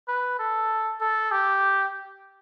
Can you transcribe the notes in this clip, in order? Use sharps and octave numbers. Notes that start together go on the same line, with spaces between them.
B4
A4
A4
G4